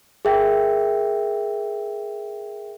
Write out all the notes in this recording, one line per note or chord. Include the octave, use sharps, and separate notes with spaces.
G#4 A#4 E5 G5